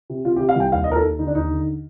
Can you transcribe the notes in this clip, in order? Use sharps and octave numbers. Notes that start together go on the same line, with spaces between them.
C3
C3 F4
G4
C3
F5
C2 G5
D#2 F5
D#5
D#2 A#4
A4
D#2
D3 D#4
D4
D#2 D#4
D3